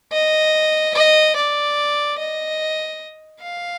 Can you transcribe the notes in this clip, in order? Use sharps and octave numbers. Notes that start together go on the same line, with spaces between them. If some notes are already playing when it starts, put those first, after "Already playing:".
D#5
D#5
D5
D#5
F5